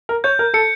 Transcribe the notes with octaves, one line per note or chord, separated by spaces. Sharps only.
A#4
C#5 G6
A#4
A4 C#7